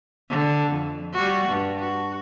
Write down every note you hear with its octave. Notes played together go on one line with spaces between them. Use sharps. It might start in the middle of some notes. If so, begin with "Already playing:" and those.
D3
F2
G3 F#4
G2
F#4